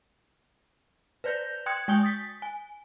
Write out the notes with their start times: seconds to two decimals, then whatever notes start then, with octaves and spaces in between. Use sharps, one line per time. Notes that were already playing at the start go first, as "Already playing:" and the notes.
1.24 B4 C5 D5 G6 A#6
1.66 G5 C6 D#6 F#6 G#6 C#7
1.88 G#3 G5 G#5 D#6 G6 G7
2.03 D#6 A6 B6
2.42 G#5